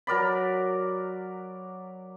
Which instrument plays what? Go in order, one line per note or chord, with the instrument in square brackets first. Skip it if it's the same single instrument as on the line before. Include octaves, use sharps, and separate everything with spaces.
[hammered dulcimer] F#3 A#4 D5 B5